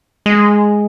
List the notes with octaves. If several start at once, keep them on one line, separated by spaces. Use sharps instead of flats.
G#3